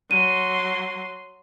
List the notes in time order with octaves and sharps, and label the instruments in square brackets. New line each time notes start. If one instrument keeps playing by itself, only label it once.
[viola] F#3 C6 [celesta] D#7